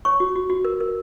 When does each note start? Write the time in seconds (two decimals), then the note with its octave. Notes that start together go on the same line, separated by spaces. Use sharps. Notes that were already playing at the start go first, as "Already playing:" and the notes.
0.05 C#5 C#6
0.20 F#4
0.36 F#4
0.49 F#4
0.65 A#4
0.80 A#4